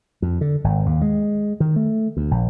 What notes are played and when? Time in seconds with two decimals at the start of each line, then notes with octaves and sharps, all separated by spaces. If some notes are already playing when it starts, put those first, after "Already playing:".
0.22 F2
0.41 D3
0.64 G#1
0.86 D#2
1.02 G#3
1.60 D#3
1.76 A3
2.17 D2
2.31 A#1